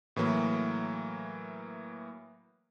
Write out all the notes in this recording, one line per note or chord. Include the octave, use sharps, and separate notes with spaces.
A2 E3 F#3 A#3